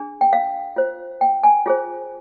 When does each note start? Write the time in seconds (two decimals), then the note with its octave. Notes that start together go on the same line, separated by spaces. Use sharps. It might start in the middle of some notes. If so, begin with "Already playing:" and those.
Already playing: D4 G#4
0.21 G5
0.33 F5
0.76 F4 C5
1.21 G5
1.44 G#5
1.66 F4 G#4 C5